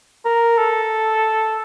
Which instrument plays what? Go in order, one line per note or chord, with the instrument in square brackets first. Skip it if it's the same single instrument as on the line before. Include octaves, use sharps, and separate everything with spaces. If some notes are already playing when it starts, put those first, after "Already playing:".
[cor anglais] A#4
A4